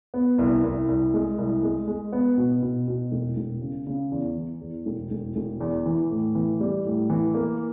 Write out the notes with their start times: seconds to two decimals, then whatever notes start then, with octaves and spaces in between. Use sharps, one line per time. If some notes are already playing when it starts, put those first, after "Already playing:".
0.14 B3
0.38 C2
0.64 C2
0.88 C2
1.14 G#3
1.38 C2
1.63 G#3
1.87 G#3
2.12 B3
2.38 B2
2.62 B2
2.88 B2
3.12 E1
3.37 E1
3.62 C#3
3.87 C#3
4.12 E2
4.36 E3
4.61 E2
4.86 E1
5.11 E1
5.36 E1
5.61 E2
5.86 E3
6.10 A2
6.35 E3
6.60 G3
6.85 A2
7.10 E3
7.35 A#3